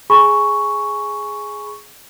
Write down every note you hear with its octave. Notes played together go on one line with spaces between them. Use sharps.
G#4 G#5 B5 C#6